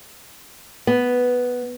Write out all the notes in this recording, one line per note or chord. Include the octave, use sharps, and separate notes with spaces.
B3